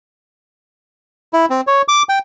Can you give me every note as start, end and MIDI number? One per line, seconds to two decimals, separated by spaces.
1.33 1.46 64
1.50 1.61 60
1.67 1.82 73
1.88 2.03 86
2.09 2.19 79